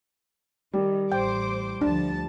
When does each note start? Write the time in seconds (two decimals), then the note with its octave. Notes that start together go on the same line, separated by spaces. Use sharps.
0.73 D#3 G3
1.12 A1 C5 G5 D6
1.81 D2 F3 D4 A5